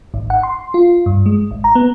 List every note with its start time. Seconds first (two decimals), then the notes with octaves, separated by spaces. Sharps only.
0.14 G#1
0.30 F#5
0.43 C6
0.74 F4
1.06 G2
1.26 G#3
1.51 G#1
1.64 A#5
1.75 B3